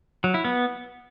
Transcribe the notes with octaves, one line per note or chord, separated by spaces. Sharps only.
F#3
E4
B3